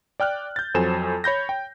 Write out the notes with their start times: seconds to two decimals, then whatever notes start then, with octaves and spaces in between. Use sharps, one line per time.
0.20 D5 G5 F6 F#6
0.56 G6 A6
0.75 F2 F#3 A4 C5 G#5 E7
1.24 C#5 B5 G6 A#6
1.49 G5